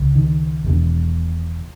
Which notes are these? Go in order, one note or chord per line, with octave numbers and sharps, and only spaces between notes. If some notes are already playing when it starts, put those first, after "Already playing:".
Already playing: C#2 C#3
D#3
E1 E2 B2